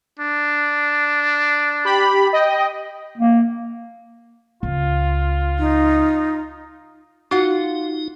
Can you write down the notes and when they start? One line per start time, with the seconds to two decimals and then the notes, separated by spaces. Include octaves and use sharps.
0.19 D4
1.85 G4 B5
2.33 D#5 G5
3.18 A#3
4.63 C#2 F4
5.59 D#4
7.31 D#4 F4 F#4 F#5